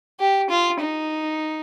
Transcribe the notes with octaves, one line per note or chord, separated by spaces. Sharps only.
G4
F4
D#4